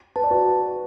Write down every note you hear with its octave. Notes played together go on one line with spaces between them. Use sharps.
B4 A5
D5
F#4 B4